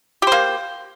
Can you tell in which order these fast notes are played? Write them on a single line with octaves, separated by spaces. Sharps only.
G4 C5 A#3